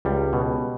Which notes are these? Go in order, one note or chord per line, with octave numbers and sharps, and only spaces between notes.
C#2 G3
B2